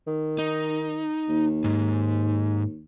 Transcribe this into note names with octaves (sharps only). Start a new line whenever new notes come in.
D#3
D#4
D#2
G#2